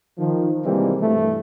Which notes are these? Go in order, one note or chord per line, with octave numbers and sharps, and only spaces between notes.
D#3 F3
C3 E3 G3 G#3 A#3 C4
G2 B2 E3 A3